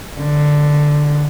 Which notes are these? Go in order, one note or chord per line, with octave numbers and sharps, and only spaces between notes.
D3